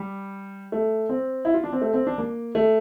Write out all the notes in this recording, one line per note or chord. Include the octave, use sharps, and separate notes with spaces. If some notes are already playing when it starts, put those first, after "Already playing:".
Already playing: G3
A3
C4
E4
F4
D4
C4
A3
C4
D4
A#3
A3